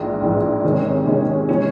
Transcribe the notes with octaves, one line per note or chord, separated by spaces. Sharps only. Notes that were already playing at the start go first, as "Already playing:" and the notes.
Already playing: A#1 G#2 E3
A#1 G#2 E3
C3 D#3 G#3 C#4
C3 D#3 G#3 C#4
E3 G#3 C#4